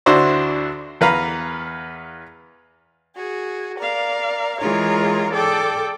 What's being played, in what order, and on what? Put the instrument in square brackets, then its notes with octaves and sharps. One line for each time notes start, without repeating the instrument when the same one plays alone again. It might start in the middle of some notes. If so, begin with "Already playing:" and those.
[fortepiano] D2 D4 E4 F#4 C5 D5
E2 B4 F5 A#5
[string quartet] F#4 G#4
A#4 D5 F5
E3 G#3 F4 G#4 A#4 C#5
G#4 A4 D5 G5 D6